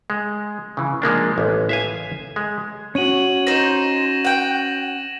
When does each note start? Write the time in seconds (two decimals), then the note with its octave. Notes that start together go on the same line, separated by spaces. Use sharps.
0.10 G#3
0.77 C#3 E3
1.02 F3 G#3 A#3 D4
1.38 A1 B3
1.69 E5 F5 G#5
2.36 G#3
2.95 C#4 F#4 G#6 D#7 F#7
3.47 D#4 C5 A#6 E7
4.25 F#5 G5